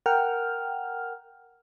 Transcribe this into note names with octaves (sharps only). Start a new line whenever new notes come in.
A#4 F#5 G5 F6